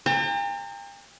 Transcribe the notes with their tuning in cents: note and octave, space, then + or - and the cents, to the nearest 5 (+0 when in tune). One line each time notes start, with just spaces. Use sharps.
G5 +40 A#5 -45